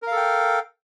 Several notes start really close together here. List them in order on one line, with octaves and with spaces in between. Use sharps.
A#4 F5 A4 G5